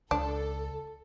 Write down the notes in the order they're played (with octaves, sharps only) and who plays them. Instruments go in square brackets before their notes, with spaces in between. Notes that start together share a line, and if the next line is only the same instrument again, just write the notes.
[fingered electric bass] C#2 [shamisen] D4 [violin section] A4